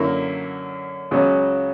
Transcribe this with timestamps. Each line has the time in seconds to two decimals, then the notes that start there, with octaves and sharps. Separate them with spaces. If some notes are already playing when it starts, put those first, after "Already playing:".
Already playing: F#2 D3 A#3 E4
1.11 C#2 C#3 F#3